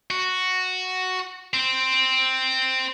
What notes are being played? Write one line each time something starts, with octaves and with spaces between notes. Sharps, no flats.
F#4
C4